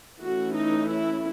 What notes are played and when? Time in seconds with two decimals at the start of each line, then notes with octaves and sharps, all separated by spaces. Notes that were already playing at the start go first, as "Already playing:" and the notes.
0.20 E3 A3 C#4 F#4
0.56 D#4
0.91 E4